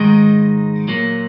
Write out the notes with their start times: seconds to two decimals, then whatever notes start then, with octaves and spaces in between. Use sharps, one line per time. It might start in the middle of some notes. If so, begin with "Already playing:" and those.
Already playing: G#2 D#3 G#3 D#4
0.88 A#2 F#3 A#3